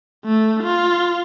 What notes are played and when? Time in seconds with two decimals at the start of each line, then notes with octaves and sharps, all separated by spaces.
0.24 A3
0.63 F4